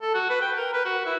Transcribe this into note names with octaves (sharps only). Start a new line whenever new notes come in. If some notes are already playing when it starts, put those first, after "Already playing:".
A4
F#4
B4
G5
A#4
B4
F#4
E4